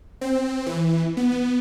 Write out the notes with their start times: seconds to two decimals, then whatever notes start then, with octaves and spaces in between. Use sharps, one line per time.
0.21 C4
0.66 E3
1.17 B3